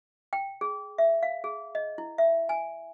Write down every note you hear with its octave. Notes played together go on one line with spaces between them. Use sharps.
G5
G#4
E5
F5
G#4
D#5
E4
E5
G#5